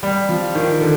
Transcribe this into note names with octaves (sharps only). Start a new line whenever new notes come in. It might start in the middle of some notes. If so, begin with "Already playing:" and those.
G3
F3
D#3
D3